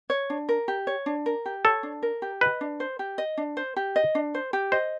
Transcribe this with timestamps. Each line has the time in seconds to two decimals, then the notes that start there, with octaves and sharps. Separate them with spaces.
0.10 C#5
0.30 D4
0.49 A#4
0.68 G4
0.87 C#5
1.06 D4
1.26 A#4
1.46 G4
1.64 A4 C#5
1.83 D4
2.03 A#4
2.22 G4
2.41 B4 D#5
2.61 D4
2.80 C5
2.99 G4
3.18 D#5
3.37 D4
3.57 C5
3.76 G4
3.96 D#5
4.15 D4
4.35 C5
4.53 G4
4.72 C5 D#5